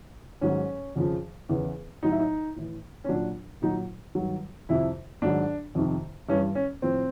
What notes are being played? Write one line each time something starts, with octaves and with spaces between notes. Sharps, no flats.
G#2 D#3 F#3 C#4
F2 C#3 F3
E2 C#3 E3
A2 F#3 D#4
E4
D#4
A2 E3
C#4
A#2 F#3 D4
A#2 F#3 D#4
G2 D#3 F#3
F2 C3 F3 E4
G#2 D#3 F#3 D4
F2 C3 D#3
G2 E3 C#4
C#4
A2 F3 C4